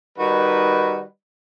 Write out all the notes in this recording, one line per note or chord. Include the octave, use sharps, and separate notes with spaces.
D#3 G3 D#4 F#4 B4